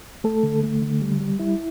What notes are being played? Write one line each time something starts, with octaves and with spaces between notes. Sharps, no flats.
A3 A4
D3
A3
D3
G3
G3
G3 E4